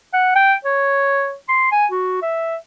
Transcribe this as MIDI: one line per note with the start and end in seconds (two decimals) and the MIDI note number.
0.14 0.32 78
0.36 0.54 79
0.65 1.35 73
1.49 1.71 84
1.72 1.86 80
1.91 2.20 66
2.22 2.56 76